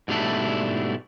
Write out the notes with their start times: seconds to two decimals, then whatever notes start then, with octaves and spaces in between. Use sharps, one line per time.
0.08 G#2 B2 G3 A3 D4 E4